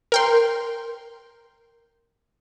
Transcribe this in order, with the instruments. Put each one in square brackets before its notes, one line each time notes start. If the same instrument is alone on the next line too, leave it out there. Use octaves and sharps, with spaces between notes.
[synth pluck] A#4 G5 C6